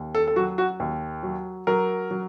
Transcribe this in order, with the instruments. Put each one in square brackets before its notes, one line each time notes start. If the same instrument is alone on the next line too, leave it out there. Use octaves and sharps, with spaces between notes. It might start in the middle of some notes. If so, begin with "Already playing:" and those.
Already playing: [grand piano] D#2
A4
A4
F#3 F#4
F#4
D#2
F#3
F#3 A#4
F#3